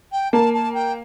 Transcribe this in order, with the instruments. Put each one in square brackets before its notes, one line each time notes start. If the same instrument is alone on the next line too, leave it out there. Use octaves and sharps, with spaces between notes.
[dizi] G5
[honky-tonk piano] A#3 [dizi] A5
[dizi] A5
G5